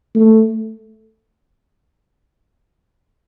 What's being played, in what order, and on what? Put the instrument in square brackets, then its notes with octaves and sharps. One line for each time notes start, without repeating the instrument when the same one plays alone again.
[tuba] A3